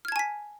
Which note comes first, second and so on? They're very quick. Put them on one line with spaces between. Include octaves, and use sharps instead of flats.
F6 G#6 A5 G#5 B6